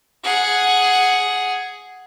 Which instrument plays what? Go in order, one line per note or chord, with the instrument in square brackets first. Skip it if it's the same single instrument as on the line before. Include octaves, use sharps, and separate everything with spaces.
[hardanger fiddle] G#4 F#5